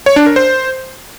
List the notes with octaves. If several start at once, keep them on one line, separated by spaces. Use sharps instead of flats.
C#5
D4
A#4
C5